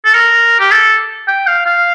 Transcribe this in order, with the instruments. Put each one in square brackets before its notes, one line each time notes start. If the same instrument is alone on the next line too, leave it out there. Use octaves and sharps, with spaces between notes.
[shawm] A4
A#4
G4
A4
G5
F5
F5